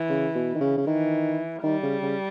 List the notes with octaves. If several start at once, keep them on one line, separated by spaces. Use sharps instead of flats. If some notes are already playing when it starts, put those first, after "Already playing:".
Already playing: E3
C#3
B2
D#3
C#3
C#3
D#3 E3
D#3 G3
C#3
C#3